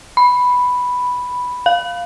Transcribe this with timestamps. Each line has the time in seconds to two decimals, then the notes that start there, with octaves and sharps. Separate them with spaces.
0.17 B5
1.66 F5